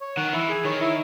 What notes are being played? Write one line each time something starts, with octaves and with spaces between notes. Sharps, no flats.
C#5
D#3 F#5
E3 E4
G#4
D#3 C#5
E4